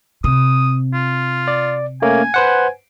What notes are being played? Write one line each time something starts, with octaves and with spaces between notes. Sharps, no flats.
C3 D#6
F4
D5
A3 A#3 C#4 G#5
B4 C5 F#5